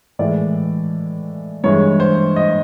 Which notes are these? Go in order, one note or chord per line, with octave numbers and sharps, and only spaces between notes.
A2 E3 G#3 D5
G2 E3 G#3 C#5
C5
D#5